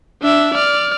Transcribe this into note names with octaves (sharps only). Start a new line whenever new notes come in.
D4 E5
D5 F6